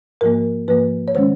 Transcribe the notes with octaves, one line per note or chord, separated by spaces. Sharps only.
G#2 F3 A#3 A#4
G#2 F3 A#3 B4
C#5
D#3 G#3 C#4 C5